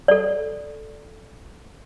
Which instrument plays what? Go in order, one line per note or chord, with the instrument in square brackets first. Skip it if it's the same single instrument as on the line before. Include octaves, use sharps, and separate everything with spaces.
[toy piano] A4 D5